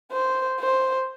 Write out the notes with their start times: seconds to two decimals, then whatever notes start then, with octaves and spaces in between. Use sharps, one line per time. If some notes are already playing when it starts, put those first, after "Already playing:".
0.12 C5
0.61 C5